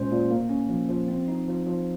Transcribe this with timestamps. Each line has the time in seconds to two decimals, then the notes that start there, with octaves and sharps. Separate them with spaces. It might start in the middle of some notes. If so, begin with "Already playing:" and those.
Already playing: A#2 G#3 C#4 C5
0.11 A#2
0.31 A#3
0.49 C#4
0.69 F3
0.89 F3
1.08 C4
1.28 D#4
1.48 F3
1.67 F3